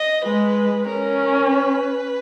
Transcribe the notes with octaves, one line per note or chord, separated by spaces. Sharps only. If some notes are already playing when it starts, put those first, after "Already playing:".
Already playing: D#5
G#3 B4
C#4 A#4
B4